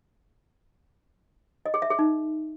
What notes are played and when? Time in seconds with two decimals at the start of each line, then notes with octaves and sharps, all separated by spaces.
1.66 D#5
1.74 G#4
1.82 E5
1.90 G#4
1.99 D#4